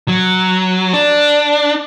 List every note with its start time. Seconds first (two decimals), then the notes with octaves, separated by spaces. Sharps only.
0.08 F#3
0.93 D4